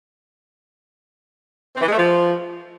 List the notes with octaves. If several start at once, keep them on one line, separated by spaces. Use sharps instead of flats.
C4
E3
G#3
A3
F3